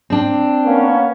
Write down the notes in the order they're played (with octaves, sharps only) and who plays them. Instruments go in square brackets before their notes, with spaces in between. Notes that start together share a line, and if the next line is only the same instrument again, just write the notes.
[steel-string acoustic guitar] C4 D4
[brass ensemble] A#3 B3 C#4